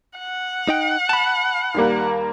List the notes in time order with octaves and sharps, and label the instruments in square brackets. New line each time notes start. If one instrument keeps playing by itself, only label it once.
[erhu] F#5
[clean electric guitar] D#4 G5
A5 B5
[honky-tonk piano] D#2 G3 A#3